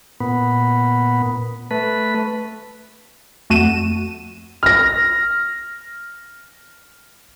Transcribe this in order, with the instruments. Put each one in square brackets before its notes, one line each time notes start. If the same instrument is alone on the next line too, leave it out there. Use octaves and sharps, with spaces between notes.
[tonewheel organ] A#2 B3
A3 B4
[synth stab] F2 A3 F#4 D#7 E7
[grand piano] F6 A#6